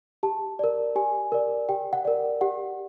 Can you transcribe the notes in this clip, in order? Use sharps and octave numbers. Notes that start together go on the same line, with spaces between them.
G4 A5
A#4 D5
G4 G#5
A#4 D5
G4 G5
F#5
A#4 D5
G4 F#5